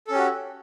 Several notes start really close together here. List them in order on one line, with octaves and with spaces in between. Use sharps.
A4 C#4 G4 F#4